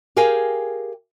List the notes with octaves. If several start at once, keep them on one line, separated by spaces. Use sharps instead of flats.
G4 G#4 A#4 F5 G5 G#5